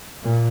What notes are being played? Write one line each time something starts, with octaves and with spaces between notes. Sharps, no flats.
A#2